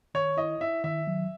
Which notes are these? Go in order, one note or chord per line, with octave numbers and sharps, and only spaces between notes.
D#3 C#5
E4 D#5
E4 E5
D#3 E5
F#3